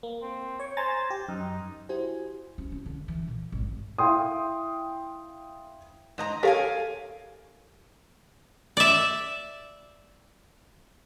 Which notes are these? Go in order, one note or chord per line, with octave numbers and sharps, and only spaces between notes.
A#3
C4
C#5 C#6
C5 G#5 A#5 A6
G4
F#2 D#4
E4 F#4 G4 C5 G#5
C#4
C#4
D3
E3
A#2
G#1
E4 F5 G5 C6 D#6
G#2 D#5 A#5
G4 A4 A#4 C#5 F5 G#5
D5 E5